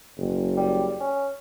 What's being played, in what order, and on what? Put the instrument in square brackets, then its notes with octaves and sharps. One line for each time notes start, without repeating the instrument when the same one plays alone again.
[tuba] F#1
[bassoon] G3
C#4